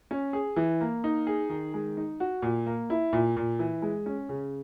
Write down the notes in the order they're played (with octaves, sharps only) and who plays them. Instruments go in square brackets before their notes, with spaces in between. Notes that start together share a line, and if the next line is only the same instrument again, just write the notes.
[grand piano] C#4
G#4
E3
A#3
D#4
G#4
D#3
G#3
D#4
F#4
A#2
A#3
E4
A#2
A#2
E3
G#3
C#4
C#3